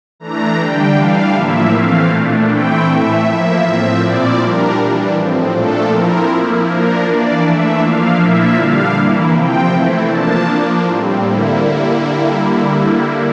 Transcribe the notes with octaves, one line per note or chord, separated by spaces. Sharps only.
E3 A3 D4 A#5
D3 G3 D4 G5
E3 G3 D4 F5
A2 F3 A#3 E4 E5
E3 A3 C4 F5
A#2 A3 D4
E3 A3 C4 E4 G5
A2 E3 A3 E5
F3 A#3 E4 E5
A2 F3 C4 E5
A#2 F3 C4 E4 D5
A#2 G3 D4 A#4
E3 G3 D4
A2 F3 C4
A#2 F3 A3 D4 A4
F3 C4 E4 A#4
F3 A#3 E4
F3 A#3 D4 A#4
E3 A#3 D4 D5
E3 A3 D4 E5
F3 A#3 D4 F5
A#2 F3 A#3 E4 E5
D3 G3 D4 F5
E3 A#3 E4
C3 F3 C4 G5
E3 A3 C4 E4
F3 A#3 D4 A5
F3 A#3 D4
A2 G3 C4
D3 G3 A#3 E4